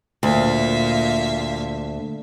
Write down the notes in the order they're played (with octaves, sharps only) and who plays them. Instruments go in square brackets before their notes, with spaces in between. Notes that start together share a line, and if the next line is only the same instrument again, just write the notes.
[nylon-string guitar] D2 [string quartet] A#2 E5 F5